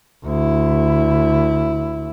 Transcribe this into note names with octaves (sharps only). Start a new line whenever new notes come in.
D2 E4